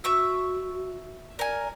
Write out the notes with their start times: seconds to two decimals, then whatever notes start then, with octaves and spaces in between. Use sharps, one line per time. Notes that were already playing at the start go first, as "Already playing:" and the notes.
0.04 F#4 E5 C#6 E6
1.39 A#4 D5 G#5